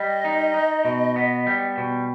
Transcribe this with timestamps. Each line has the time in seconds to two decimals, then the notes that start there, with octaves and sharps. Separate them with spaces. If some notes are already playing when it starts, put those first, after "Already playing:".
Already playing: G3 D#5
0.25 D#4
0.54 D#4
0.85 B2
1.16 B3
1.47 G3
1.77 B2